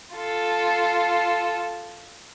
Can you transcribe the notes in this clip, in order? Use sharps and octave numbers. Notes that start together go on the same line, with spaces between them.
F4 A4